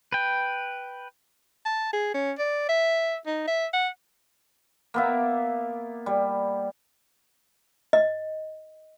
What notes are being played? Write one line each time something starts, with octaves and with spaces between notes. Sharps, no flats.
B4 G5
A5
G#4
C#4
D5
E5
D#4
E5
F#5
A#3 B3 E5
G3
D#5